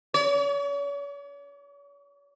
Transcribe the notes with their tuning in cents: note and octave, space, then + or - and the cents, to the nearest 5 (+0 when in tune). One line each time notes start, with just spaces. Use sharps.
C#5 +40